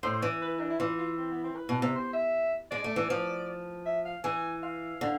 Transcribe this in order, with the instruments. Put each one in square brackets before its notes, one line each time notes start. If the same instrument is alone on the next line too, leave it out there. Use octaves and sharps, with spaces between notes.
[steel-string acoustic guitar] A2 [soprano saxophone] C5
[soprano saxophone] C5
[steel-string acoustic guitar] E3 [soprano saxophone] D5
[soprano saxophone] B4
D4
E4
[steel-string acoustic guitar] E3 [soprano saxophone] F4
[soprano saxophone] F4
C4
B3
C4
B4
[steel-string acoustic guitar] B2
C3
[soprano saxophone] C5
E5
[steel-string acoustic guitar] G#3 [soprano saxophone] D5
[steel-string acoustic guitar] A3
E3
F3
[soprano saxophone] E5
F5
[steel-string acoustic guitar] E3 [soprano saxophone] G#5
[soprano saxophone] F5
[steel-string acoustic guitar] D3